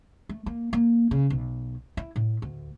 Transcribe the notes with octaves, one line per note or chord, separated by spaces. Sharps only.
A3
A#3
A#3
C#3
B1
E4
A2
D2